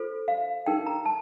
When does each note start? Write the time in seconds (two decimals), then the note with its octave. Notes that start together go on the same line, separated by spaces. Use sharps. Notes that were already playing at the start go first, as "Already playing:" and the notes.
Already playing: F4 A4 C5
0.28 F5
0.66 D#4 A#4 G5
0.86 A#5
1.05 A5